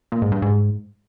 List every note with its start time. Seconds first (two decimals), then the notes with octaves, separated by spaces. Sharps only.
0.12 A#2
0.22 G#2
0.32 G2
0.42 G#2